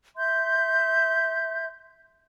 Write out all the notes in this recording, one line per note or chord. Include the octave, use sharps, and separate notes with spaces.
E5 C6 G6